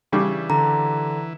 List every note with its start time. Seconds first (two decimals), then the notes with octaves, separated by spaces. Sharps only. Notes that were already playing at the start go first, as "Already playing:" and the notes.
0.12 C#3 E3 G3 D4
0.50 D3 A#5